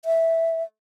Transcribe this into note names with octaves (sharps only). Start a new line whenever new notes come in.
E5